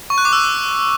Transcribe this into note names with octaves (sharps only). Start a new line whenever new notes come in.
C#6
F#6
D6
E6